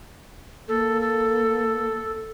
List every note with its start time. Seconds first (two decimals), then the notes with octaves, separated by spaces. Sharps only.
0.68 A#3 A4
1.01 A4